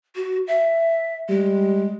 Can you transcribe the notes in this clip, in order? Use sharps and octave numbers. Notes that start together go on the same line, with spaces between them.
F#4
E5
G3 G#3